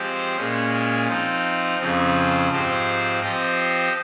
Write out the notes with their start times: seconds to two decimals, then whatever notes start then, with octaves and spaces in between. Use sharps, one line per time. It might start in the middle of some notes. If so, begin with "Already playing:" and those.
Already playing: F3 G#3 C4 G4 C5
0.36 A#2 G#3 C#4
1.07 F3 C4 D#4
1.78 F2 C#3 F3 C4
2.50 G#2 F3 C4 G4 C5
3.21 F3 C4 G4 C5 D#5